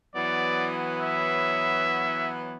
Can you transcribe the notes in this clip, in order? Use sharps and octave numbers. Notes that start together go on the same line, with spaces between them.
E3 F#3 B3 D5
E5